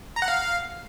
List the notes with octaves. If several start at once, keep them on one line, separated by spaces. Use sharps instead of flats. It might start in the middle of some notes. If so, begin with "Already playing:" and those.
A#5
F#5
F5